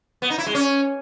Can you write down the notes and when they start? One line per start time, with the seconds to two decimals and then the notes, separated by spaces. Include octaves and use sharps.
0.22 B3
0.30 D#4
0.38 E4
0.46 G#3
0.55 C#4